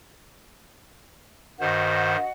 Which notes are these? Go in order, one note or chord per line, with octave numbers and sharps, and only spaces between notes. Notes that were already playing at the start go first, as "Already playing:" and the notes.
G2 D#3 F#4 C5 D#5 F#5